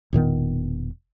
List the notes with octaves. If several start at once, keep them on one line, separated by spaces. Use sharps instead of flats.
E1 A#2 D#3 B3